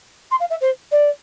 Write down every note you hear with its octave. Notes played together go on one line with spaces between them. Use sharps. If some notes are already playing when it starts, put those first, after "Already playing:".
C6
F5
E5
C5
D5